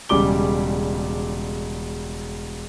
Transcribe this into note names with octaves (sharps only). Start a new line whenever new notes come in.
E1 C#3 G3 D6 G7